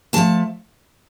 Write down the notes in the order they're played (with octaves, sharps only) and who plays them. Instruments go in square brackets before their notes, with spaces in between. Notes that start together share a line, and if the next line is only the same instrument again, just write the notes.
[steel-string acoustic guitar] G2 F3 A3 A5